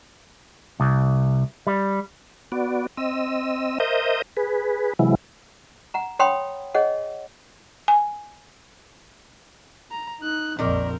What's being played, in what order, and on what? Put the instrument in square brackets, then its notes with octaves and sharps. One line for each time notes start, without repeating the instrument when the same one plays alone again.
[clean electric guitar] C2
G3
[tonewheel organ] B3 F#4 D5
C4 D#5 E6
A#4 C5 D#5 E5 D#6 G6
G#4 B4
C3 E3 F#3 G#3 E4
[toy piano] F#5 A#5
C#5 F#5 G5 B5 C6 D#6
G#4 C#5 D#5 F#5
[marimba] G#5
[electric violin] A#5
D#4 F#6
[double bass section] A#1 F2 [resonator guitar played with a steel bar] D#3 D5 [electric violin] C4 A#4